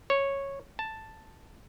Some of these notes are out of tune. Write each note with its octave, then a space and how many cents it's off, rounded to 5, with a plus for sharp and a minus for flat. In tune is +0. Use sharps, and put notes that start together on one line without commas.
C#5 -5
A5 +5